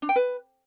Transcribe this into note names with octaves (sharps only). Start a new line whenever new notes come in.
D4
G5
B4